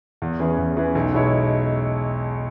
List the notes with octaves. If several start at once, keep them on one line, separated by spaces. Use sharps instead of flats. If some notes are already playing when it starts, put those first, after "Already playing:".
E2
E3 C#4 G#4 B4
E2
E3 C#4 G#4 B4
B1
B2 G#3 E4 C#5